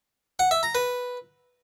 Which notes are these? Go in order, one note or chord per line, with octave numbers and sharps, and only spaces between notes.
F#5
E5
A#5
B4